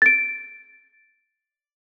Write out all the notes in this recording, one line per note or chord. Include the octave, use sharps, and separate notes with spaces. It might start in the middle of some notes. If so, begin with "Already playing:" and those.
A6 D7